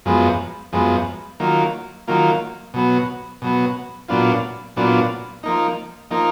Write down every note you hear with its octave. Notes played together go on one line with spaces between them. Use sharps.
F#2 F3 G#3 B3
F#2 F3 G#3 B3
D#3 F#3 A#3 F4
D#3 F#3 A#3 F4
B2 F#3 B3
B2 F#3 B3
A#2 F#3 B3 D4 F4
A#2 F#3 B3 D4 F4
F3 A#3 D#4
F3 A#3 D#4